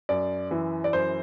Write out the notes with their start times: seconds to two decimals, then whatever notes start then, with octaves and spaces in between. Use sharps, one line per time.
0.09 F#2 D5
0.51 E3
0.84 D5
0.93 F#2 C5